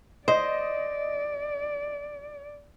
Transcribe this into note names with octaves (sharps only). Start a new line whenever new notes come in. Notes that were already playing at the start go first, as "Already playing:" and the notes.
C5 D5 D#5